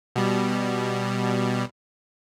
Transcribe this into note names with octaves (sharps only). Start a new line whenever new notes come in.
B2 G3